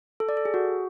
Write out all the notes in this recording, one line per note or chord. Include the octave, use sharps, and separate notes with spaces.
A4
D5
A4
G#4
F#4